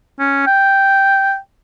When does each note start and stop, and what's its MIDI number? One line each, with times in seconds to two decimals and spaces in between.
0.19 0.45 61
0.47 1.37 79